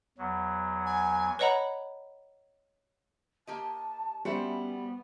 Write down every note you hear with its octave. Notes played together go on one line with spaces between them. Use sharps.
E2 F#3
G#5
B4 C#5 D#5 F#5 A#5 B5
A#3 G4 D#5 A5
G3 B3 C#4 F#4 C5 E5